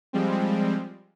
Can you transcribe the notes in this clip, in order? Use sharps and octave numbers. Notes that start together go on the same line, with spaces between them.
F3 G3 G#3 C4